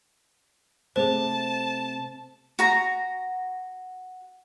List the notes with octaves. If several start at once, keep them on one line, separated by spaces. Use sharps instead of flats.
C3 A3 C4 G#4 C5 A5
F#4 A#5